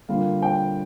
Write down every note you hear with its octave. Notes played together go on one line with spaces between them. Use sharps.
D3 G3 A#3 F4 F5
G5